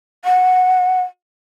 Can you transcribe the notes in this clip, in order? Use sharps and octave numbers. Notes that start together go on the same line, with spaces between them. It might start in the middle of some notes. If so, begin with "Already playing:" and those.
F#5